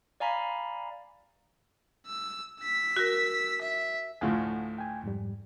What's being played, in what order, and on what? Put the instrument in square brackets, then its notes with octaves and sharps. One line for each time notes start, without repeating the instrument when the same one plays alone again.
[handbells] D5 F5 G#5 A#5 B5 B6
[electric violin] E6
E6 B6
[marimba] F#4 A#4
[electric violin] E5
[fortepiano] D2 A2 F3 [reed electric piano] F5 F#5 G#5
[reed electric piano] G5 G#5
F2 G#2 G3